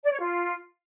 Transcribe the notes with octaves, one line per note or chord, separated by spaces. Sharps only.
D5
C#5
F4